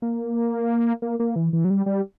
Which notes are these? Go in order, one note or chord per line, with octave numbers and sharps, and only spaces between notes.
A#3
A#3
A#3
E3
E3
F#3
G3
G3